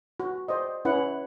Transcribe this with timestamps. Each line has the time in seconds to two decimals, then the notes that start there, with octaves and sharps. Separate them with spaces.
0.20 F#4
0.48 C5 D5 D#5
0.85 C#4 E4 B4 F#5